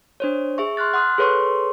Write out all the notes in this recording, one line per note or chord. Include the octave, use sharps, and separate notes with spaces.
D4 C5 C#5
G#4 E5 C#6
C6 F6 F#6 A6
F#5 C6 D#6 F6 F#6
G#4 A4 B4 C#5 C6 C#6